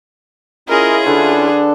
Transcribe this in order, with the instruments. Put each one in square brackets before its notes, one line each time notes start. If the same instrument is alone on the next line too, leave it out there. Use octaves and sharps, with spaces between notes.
[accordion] C#4 E4 F4 [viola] G#4 [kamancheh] A#4 D#5
[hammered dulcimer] D3 D4 B4 [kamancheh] A4